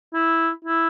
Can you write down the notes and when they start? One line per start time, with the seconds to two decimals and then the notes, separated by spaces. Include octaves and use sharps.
0.14 E4
0.65 E4